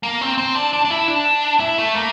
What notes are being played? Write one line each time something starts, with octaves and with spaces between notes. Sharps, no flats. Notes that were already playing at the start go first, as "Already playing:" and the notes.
A#3
C4
C4
D4
D4
D4
E4
D4
E4
A3
A#3